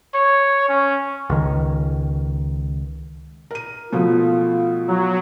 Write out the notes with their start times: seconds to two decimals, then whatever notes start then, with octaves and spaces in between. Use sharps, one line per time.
0.15 C#5
0.69 C#4
1.30 C#2 D#3
3.51 A#4 D#7
3.93 B2 F3 A3 F4
4.88 F#3